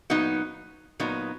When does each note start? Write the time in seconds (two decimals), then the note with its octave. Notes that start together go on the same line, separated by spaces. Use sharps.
0.10 A#2 F#3 B3 D#4
1.00 A#2 F#3 B3 D#4